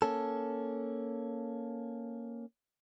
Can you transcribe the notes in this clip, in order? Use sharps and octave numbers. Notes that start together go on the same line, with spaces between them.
A#3 C#4 A4